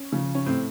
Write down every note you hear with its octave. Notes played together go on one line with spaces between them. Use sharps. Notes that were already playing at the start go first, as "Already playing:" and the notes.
Already playing: C#4
C#3 F3
C#4
A2 C4